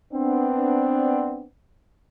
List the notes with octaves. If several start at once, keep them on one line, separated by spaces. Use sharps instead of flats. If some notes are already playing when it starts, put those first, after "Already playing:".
B3 C4 D4